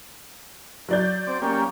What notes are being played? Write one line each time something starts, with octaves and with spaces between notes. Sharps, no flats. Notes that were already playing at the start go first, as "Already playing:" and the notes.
F#3 D5 G6
C4 D6
A#3 C#4 G4